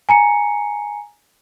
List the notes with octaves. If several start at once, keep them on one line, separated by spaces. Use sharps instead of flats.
G#5 A#5 C#7